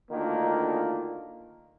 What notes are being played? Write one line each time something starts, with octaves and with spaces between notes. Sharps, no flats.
D2 D#3 A#3 D4 F4